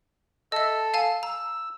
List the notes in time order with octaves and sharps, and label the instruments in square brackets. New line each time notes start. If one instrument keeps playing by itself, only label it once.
[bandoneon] A4 E6 [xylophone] D#5 E5
[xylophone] F5 G#5 A5
[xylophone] A#5 [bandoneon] E6